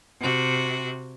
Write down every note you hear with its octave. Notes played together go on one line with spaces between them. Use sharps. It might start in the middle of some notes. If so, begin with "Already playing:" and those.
C3 F#4